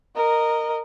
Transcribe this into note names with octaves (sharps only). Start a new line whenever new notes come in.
A#4 D#5